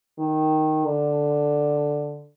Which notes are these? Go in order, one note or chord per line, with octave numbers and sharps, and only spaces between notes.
D#3
D3